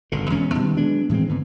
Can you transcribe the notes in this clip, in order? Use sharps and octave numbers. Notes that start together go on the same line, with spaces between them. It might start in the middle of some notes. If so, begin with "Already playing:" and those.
G1 B2 D3
E2 B2 G#3 C#4
B2 D#3 G3
F#3 G#3 B3 D4
A2 E3 G#3 C4
G#2 D3 B3